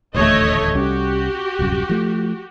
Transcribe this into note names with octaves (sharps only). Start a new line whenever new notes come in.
D#1 A1 D2 A3 C#5 D#5
C2 G3 C#4 F#4 G4
D1 C2 F#2
F3 A3